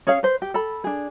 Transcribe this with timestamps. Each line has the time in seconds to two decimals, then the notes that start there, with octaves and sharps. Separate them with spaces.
0.07 C#4 G#4 C#5 F5
0.23 B4 C5
0.42 G4
0.54 A4 B5
0.84 D4 G#4